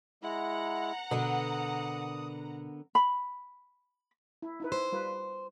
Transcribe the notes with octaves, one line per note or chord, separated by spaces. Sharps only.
G#3 E4 F#5 A#5
B2 D3 B3 A#4 D#6
B5
E4
D#4 E4 B4
C5
G3 F4 B4